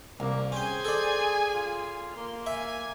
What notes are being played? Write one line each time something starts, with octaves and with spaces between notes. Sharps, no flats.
C2 A#3
C#4 G#4 C5 G5 G#5
A4 D5
F4
A#3 C6
E5 G#5